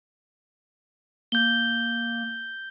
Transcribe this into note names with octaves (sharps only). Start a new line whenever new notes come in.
A#3 G6 G7